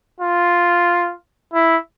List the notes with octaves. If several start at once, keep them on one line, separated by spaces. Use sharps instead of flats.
F4
E4